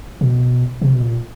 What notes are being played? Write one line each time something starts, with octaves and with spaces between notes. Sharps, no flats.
B2
C3
B2
A#2